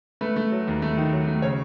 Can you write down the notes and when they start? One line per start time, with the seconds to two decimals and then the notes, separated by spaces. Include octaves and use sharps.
0.21 A3 B4
0.36 A3
0.52 F#3
0.67 D#2
0.82 A3
0.97 D#3
1.13 F#3
1.27 A3
1.42 C#3 C#5